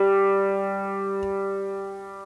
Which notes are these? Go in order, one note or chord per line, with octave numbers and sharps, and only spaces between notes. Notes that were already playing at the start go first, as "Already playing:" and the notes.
Already playing: G3